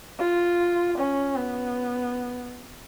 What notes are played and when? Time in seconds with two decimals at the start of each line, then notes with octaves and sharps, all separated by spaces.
0.19 F4
0.98 C#4
1.37 B3